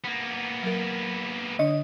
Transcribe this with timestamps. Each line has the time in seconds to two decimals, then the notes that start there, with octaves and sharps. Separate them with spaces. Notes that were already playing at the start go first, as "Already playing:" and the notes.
0.05 A#3 B3
0.63 F#3 A#4
1.59 D3 D4 D#5